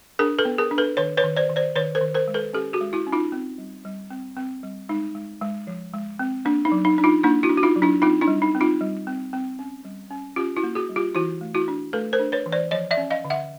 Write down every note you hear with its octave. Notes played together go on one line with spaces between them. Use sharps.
D4 G#4 A#4
A4 B4
B3
G#4 A#4
D4
A4 B4
D#3 B4 C#5
B4 C#5
D#3
C5 D5
D#3
C5 D5
D#3 B4 C#5
A#4 C5
D#3
A#4 C5
G#3
A4 B4
C#4 G4 A4
F#4 G#4
G#3
E4 F#4
C#4
D#4 F4
C4
G3
G3
C4
C4
G3
G#3 D#4
G#3
G#3
F3
G#3
C4
A#3 D4
D#4
F#3
D#4
D4
D#4 F4
A#3 D4 E4
E4 F#4
D4
F#4
D#4 F4
F#3
D4 E4
C4 D#4 F4
D4 E4
G3
D#4
C4
D#4 F4
G3
C4
C4
C#4
G3
C#4
C#4 F4 G4
E4 F#4
A#3
F#4 G#4
G3
F4 G4
E3 E4 F#4
A3
E4 F#4
D4
A3 A4 B4
A#4 C5
D4
B4 C#5
E3
C5 D5
F3 C#5 D#5
D5 E5
C#4
D#5 F5
D3
E5 F#5